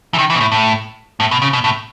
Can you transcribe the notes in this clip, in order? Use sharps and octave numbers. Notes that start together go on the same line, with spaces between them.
E3
D#3
E3
B2
A2
A2
A2
B2
C#3
B2
A2